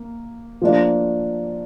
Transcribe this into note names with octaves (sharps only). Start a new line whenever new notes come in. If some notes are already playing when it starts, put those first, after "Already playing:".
Already playing: A#3
F3 A#3 D4